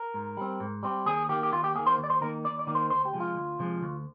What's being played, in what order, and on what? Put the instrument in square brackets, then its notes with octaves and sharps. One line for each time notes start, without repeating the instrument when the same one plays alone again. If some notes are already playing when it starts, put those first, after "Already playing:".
Already playing: [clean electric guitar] A#4
G#2
G3 C4
G#2
G3 C4
D#2 G#4
D#3 A#3 G4
G4
D#2 F4
G4
A#3 G#4
D#3
C5
D#2
D5
C5
D#3 A#3 A#4
D#2 D5
D5
D#3 A#3
C5
D2 C5
G4
C3 F3 G#3
F4
D2
C3 F3 G#3
D2